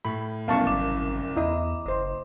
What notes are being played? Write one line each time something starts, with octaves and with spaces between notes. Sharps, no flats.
A2 B5
F#1 C2 F#2 B3 F5 A5 C#6
G#1 D6
E2 E4 D#5 A#5
F#1 C5 D#5